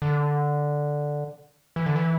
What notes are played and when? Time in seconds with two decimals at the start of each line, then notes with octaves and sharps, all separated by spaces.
0.02 D3
1.76 E3
1.86 D3
1.96 E3